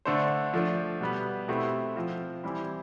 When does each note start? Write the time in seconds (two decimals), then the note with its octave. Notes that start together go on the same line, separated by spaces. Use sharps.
0.05 D3 A3 D4 A4 C5
0.53 F3 A3 D4
1.01 B2 G3 B3
1.48 B2 A3 C4 E4 G4
1.96 F3 C4 F4
2.44 E3 G3 C4 E4